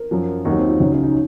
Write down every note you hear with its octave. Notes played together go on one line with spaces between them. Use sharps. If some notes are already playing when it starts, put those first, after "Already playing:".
Already playing: A#4
F#2 F3
D#2 D#3 F#3 D#4
C4
F4
C#2 C#3 F#3 D#4
C#4
D#4